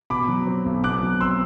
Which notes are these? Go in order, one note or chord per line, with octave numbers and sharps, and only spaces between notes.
B2 B5 D6
F#3
C4
B1
B2 D6 F#6
F#3
C4 C6 E6